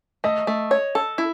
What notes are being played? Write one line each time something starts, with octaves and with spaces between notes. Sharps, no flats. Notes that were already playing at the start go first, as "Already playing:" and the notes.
A3 D#5
A3
C#5
A4
E4